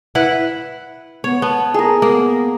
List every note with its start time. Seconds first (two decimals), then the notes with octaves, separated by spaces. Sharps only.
0.15 E4 B4 F#5
1.24 B3 C#5
1.42 B3 A5
1.74 G#4 A#4
2.02 A#3 B3